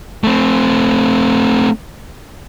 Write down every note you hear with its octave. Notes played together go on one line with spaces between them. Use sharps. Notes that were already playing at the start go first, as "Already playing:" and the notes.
A3 C4